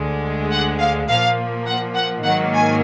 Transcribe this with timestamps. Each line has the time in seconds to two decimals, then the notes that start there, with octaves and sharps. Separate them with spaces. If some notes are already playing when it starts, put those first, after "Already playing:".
Already playing: D2 D3 G#3
0.51 F#5
0.80 F5
1.08 A#2 F3 A#3 F5
1.67 F#5
1.95 F#5
2.23 G#2 D#3 F#3 A#3 F#5
2.53 G#5